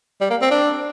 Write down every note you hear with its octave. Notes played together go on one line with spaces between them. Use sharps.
G3
A#3
C4
D4